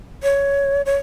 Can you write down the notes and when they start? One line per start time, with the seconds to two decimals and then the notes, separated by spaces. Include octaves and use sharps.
0.23 C#5
0.86 C#5